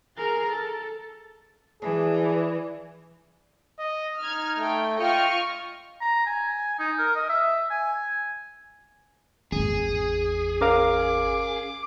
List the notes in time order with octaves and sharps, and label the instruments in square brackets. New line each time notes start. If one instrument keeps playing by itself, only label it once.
[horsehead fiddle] G#4 A#4
A4
[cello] E3 [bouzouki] D4 [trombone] G#4
[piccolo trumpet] D#5
[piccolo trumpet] D#4 [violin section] F6 G#6
[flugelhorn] A3 [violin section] G5
[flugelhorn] F4 [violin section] D#5 C#6 F6 [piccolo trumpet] G5
[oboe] A#5
G#5
D#4
A#4
D#5
E5
G#5
[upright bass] G#1 E2 [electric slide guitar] G#4
[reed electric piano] C#4 A#4 F5 [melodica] D6